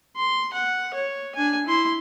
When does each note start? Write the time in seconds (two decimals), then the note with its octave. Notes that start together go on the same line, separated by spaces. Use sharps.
0.16 C6
0.53 F#5
0.93 C#5
1.35 D4 G#5
1.66 E4 C6